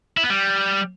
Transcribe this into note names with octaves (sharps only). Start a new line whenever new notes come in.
E4
B3
G3